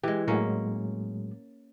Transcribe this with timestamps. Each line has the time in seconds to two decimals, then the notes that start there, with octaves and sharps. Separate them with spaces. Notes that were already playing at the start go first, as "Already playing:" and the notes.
0.04 E3 G#3 G4
0.28 A2 F#3 G#3 A#3 C#4